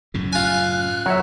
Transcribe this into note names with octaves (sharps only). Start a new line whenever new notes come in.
F#2 A2 C#3
F4 G#5 F#6
F#3 C#5 E5